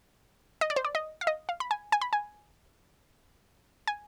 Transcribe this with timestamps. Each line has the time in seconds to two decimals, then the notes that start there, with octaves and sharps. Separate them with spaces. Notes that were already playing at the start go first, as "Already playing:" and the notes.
0.61 D#5
0.70 D5
0.76 C5
0.85 D5
0.95 D#5
1.21 F5
1.27 D#5
1.49 F5
1.60 B5
1.71 G#5
1.92 G#5
2.01 B5
2.13 G#5
3.87 G#5